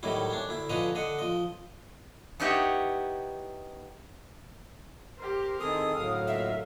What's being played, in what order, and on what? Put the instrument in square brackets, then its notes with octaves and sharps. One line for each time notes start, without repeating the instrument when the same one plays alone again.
[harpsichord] A2 D#3 F#3 G3 E4
C#4 D4
D2 E4
D3 F3 C#4 B4 D#5 A#5
D3 D#5 F#5
F3 D#5
[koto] B3 D#4 E4 G4 C#5
[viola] G4 C5 [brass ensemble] A#4
[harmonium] D#3 G#4 A4 [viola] C4 E4 [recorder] D#6
[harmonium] A2 D3 F#3 [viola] A#4 F5
[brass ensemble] A#2 D#5 [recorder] E5